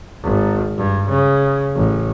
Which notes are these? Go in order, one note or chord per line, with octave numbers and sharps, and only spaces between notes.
G#1
G2
C#3
A1